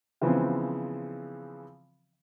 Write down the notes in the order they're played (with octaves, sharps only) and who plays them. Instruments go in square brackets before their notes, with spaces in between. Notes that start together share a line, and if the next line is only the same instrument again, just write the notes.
[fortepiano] C#3 E3 F3 G#3 B3 C4